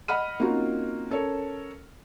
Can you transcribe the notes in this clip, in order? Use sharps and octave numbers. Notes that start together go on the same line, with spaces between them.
D#5 F#5 B5 F6 D#7
A#3 C4 C#4 D#4 F4 F#4
C#4 A4 A#4 C#5